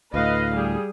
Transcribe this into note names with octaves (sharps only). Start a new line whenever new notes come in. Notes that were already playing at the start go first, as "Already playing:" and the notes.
D2 A2 B4 D#5 F5
G3 G#4